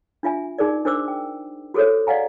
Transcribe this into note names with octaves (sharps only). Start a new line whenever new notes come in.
D4 F4 E5 G#5
D#4 G#4 A#4 D5
D4 A#4 C5 D6 E6
G5
F#4 G#4 A4 C5 C#5
D5 D#5 F5 F#5 G#5 A#5